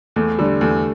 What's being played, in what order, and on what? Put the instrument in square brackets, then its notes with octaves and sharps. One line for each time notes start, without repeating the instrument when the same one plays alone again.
[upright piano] E2 [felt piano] A3
[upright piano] D3 [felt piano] G3
[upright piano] E2 [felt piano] A3